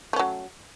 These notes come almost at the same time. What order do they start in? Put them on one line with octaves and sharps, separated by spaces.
A3 C#4 F#3